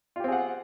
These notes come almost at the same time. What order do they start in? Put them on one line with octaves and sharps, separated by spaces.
F4 G4 C4 G#4 F#5